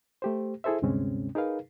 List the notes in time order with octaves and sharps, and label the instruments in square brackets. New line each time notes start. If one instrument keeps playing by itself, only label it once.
[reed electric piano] A3 G4 C5
E4 G#4 A4 C5 E5
D2 G2 C3 G#3 C4 C#4
D#4 G#4 A#4 B4 F5